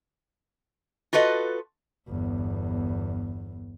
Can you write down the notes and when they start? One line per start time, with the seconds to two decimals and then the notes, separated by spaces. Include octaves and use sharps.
1.13 F4 F#4 A4 B4 D#5
2.08 G1 E2